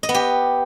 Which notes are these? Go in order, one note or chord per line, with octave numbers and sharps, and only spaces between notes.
D#5
B3
G4